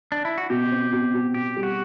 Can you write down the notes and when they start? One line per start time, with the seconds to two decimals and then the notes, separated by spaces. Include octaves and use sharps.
0.12 D4
0.25 E4
0.38 F#4
0.50 B2 G4
0.72 C4
0.92 B2
1.14 B2
1.34 B2 G4
1.56 G3
1.63 F#4